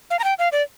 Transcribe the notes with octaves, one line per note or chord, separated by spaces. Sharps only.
F5
A#5
G5
F5
D5